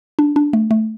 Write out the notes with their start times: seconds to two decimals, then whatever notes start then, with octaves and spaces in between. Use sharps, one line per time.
0.19 D4
0.36 D4
0.53 A3
0.71 A3